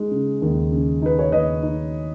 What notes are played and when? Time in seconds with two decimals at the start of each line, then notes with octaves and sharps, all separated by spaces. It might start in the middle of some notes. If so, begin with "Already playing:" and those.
Already playing: G#3 D#4
0.11 C#3
0.42 D#2
0.72 C#3
1.02 D#4 B4
1.19 C#5
1.32 D#2 B4 D#5
1.63 D#4